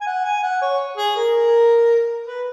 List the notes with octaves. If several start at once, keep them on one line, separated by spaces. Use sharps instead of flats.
G#5
F#5
G#5
F#5
C#5
G#4
A#4
B4